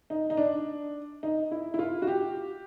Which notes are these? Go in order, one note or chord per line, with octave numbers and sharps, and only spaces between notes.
D#4
D#4
D4
D#4
E4
E4
F4
F#4
G4